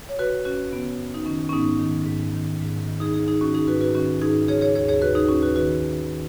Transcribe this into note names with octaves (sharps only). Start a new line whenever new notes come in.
C#5
C#3 F#4 B4
F#2 C#4 F#4
C#3 B3
F#2
D#4
D#3 C#4
C#4
G#2 B3 D#4
D#3
G#2
D#3
G#2
D#3
D#4 G#4
G#2 D#4 G#4
D#4 G#4
D#3 C#4 F#4
D#4 G#4
G#2 F#4 B4
F#4 B4
D#3 C#4 F#4
G#2 D#4 G#4
C#3 G#4 C#5
G#4 C#5
D#2 G#4 C#5
G#4 C#5
C#3 F#4 B4
D#4 G#4
D#2 C#4 F#4
F#4 B4
D#3 F#4 B4
D#2
D#3